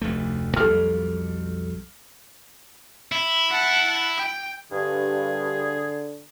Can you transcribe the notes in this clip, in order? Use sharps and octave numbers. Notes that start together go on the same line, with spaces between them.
F1 D2 A3
B1 F2 G3 A4 F6
E4
F#5 A5
G5
G2 D3 G#4